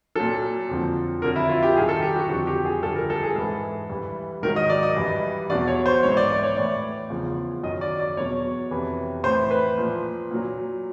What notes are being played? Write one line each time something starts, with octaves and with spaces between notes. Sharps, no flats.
A#2 F#3 A4
F2 D3 F3
F2 D3 F#3 A#4
E4
F4
G4
G2 D#3 F#3 G#4
A4
G4
F#4
F2 D3 F3 F#4
G4
G#4
G2 D3 F3 A4
A#4
A4
G#4
G#2 E3 A4
G2 E3
G#2 D#3 F#3 A#4
D#5
D5
D#5
G2 E3
E2 B2 F#3 D5
C#5
C5
G#2 E3 C#5
D5
D5
C#5
A2 E3 D5
E2 C#3 F3
F#2 D#3 F#3 D#5
D5
D5
E2 B2 F#3 C#5
F2 C3 E3
A2 E3 C5
B4
A#2 F3
A#2 F#3